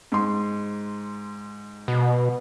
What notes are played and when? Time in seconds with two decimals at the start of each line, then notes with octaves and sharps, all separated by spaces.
0.12 G#2 C6
1.88 B2